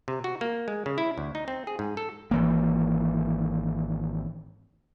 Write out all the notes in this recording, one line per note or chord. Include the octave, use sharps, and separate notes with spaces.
C3
F#4
A#3
G#3
C#3
E4
D2
D#4
C4
G#4
G#2
A4
G#1 E3 A#3